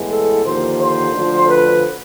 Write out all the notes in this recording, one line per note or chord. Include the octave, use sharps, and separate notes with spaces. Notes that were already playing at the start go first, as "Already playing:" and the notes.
Already playing: A2 E3 G#3 B3
A4
D#2 D3 F3 A#3 C5
C5
D2 D3 F3
B4